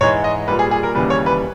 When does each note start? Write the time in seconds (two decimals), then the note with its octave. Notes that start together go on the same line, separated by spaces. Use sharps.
0.01 G#2 E3 G#3 C#5
0.24 D#5
0.48 A#2 G3 B4
0.59 G#4
0.71 G#4
0.83 A#4
0.95 D#2 C#3 E3 G3 B4
1.10 C#5
1.26 B4